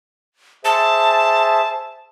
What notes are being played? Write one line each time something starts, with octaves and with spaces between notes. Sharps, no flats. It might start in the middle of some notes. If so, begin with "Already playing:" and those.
G#4 C5 E5 A5